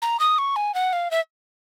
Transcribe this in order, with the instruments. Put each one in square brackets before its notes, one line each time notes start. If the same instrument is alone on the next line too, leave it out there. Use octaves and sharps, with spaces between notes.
[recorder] A#5
D#6
C#6
G#5
F#5
F5
E5